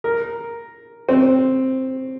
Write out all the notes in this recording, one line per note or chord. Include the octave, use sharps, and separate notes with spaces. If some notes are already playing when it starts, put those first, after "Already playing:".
A#4
C4